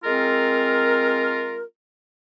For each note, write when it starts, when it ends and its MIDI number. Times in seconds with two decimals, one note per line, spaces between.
0.05 1.63 56
0.05 1.63 60
0.05 1.63 65
0.05 1.63 70